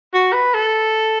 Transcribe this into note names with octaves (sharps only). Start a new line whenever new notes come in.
F#4
B4
A4